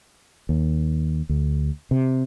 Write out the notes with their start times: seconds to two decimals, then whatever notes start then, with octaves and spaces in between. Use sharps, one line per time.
0.49 D#2
1.29 D2
1.91 C3